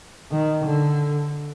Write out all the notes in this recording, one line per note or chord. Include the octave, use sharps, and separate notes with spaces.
D#3
D3